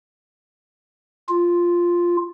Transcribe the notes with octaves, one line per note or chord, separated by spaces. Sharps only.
F4